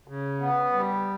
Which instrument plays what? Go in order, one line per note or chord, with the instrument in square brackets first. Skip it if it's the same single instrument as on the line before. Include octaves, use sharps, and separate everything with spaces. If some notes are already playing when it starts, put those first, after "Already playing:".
[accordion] C#3
B3
G3